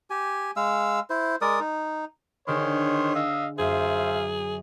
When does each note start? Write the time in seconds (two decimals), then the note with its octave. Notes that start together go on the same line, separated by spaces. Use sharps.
0.10 G4 G#5
0.56 G#3 F5 E6
1.10 E4 C5
1.41 G#3 A#4 D5 D#6
1.60 D#4
2.48 D3 D#3 G#4 C5 C#5 C6
3.15 D#5 F5 E6
3.59 F#2 G#4 C5 E5 F5